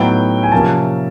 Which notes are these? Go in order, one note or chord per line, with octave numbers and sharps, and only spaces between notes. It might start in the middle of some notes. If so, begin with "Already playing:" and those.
Already playing: A2 F#3 B3 D#4 G5
G#5
C3 F3 A#3 C#4 A5